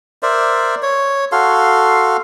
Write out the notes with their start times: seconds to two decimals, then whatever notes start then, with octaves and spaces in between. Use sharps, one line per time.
0.23 A#4 C5 D5 E5
0.82 C#5
1.32 F#4 A4 F5 C6